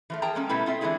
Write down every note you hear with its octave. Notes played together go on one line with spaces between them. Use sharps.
E3 F3 A3
G#4 A#4 G5 A5 A#5
G#3 A#3 C#4
B2 G3 A3 E4 A4 B4
C4 F4 E5
E3 G#3 D4 E4 G#4